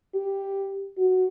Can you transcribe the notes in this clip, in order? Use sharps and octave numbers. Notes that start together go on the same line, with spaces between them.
G4
F#4